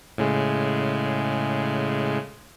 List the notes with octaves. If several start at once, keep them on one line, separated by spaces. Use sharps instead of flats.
A2 C#3 G#3